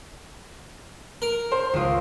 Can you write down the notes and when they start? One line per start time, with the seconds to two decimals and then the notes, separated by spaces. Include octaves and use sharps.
1.22 A#4
1.52 C5
1.73 C#2 F4